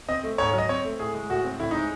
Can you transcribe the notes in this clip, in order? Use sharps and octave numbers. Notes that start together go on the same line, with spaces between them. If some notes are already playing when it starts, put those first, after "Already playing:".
C4 D#5
A3
G#2 C#5
F#3 D#5
C4 C#5
A3
A2 G#4
G#3
A2 F#4
C4
A2 E4
G#3 D#4